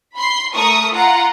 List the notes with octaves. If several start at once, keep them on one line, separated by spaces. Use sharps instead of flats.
B5 C6 C7
A3 A#4 C#6 D#6
F4 F#5 A#5